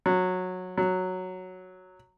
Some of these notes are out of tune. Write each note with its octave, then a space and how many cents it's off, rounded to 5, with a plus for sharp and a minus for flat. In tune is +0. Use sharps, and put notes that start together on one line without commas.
F#3 -15
F#3 -5